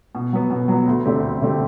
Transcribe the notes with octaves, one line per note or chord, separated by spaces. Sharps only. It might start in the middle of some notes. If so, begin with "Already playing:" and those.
B2
F#3 B3
B2
F#3 B3
D2
D3 A3 C4 G4
D2
D3 A3 C4 G4